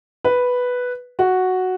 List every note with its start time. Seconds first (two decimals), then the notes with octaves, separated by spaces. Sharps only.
0.24 B4
1.19 F#4